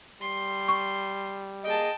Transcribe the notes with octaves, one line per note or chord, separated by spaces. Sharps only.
G3 C6
C#6
A#3 G#4 D#5 G5 A5